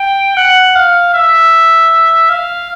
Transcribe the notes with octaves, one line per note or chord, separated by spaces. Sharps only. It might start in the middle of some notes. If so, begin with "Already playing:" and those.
Already playing: G5
F#5
F5
E5
F5